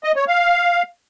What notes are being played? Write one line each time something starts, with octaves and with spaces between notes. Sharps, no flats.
D#5
C#5
F5